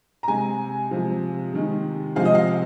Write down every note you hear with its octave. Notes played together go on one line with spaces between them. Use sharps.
A#5
C3 G#3 G#5
C3 F3 G#3
C3 D#3 G#3
C3 F3 G#3 F5
D#5
F5